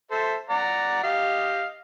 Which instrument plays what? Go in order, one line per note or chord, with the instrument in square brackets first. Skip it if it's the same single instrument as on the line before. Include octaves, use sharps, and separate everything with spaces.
[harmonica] A4 C5 E5
D5 F#5 A#5
G4 D#5 F5